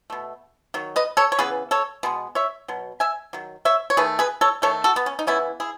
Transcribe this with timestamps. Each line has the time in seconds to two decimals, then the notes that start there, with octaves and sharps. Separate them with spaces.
0.10 B2 A3
0.74 D#3 F#3
0.96 B4 D#5
1.17 A4 C#5
1.32 C#5
1.39 C#3 E3 B3 G#4 B4
1.71 A4 C#5
2.03 B2 G#3 B3
2.35 C#5 E5
2.68 B2 F#3
3.00 E5 G#5
3.33 D#3 F#3
3.65 C#5 E5
3.90 C#5
3.97 D#3 A3 G#4 B4
4.19 G#4 B4
4.41 A4 C#5
4.62 D#3 A3 A4 C#5
4.84 F#4 A4
4.96 B3
5.06 C#4
5.19 D#4
5.27 C#3 E3 B3 C#4 E4
5.60 E4 G#4